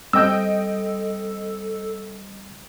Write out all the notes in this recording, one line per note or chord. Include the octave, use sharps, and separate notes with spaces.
G3 C4 A4 D#5 G5 E6 G6